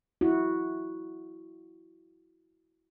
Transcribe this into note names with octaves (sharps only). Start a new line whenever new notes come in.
E4 F#4